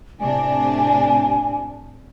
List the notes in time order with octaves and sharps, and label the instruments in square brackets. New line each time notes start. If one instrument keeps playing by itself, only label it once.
[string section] A2 C3 D4 [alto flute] G#5